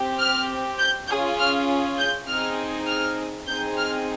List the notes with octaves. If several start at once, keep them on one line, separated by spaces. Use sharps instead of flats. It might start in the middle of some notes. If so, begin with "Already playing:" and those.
Already playing: C4 G4
F6
G6
C#4 F4 G#4 G6
F6
G6
C4 D#4 G#4 F6
F6
C4 D#4 G#4 G6
F6